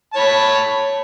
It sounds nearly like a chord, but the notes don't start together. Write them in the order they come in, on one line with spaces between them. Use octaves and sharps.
A5 C#5 B5